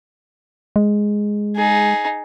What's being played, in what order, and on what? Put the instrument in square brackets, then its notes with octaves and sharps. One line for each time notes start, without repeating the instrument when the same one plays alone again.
[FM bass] G#3
[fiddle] D#4 G#4